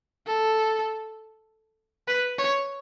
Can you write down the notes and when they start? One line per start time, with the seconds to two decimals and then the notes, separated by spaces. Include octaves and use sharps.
0.27 A4
2.08 B4
2.38 C#5